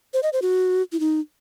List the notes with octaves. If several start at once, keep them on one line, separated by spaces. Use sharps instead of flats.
C5
D#5
C5
F#4
E4
D#4